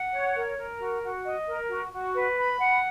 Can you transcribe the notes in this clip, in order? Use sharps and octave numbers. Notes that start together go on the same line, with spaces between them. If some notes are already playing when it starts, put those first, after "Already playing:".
Already playing: F#5
C#5
A#4
A#4
F#4
F#4
D#5
A#4
F#4
F#4
B4
B5
F#5